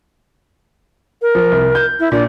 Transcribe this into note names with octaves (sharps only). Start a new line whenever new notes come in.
A#4
F3
C2
G6
E4
A#2 D4